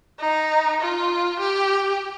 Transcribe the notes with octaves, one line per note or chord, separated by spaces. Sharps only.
D#4
F4
G4